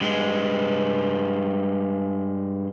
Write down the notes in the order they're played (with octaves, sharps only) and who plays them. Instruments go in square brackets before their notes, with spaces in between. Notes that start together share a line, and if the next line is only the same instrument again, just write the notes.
[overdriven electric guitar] G2 G#3